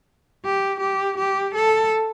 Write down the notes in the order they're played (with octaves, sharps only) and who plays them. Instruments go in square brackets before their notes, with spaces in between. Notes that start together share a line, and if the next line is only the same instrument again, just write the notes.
[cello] G4
G4
G4
A4